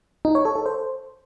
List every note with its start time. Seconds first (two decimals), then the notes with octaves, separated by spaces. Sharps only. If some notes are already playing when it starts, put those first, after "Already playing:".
0.25 D#4
0.35 C#5
0.45 A4
0.55 A4
0.66 C5